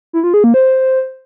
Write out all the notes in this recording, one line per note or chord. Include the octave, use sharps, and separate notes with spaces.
E4
F4
G#4
A#3
C5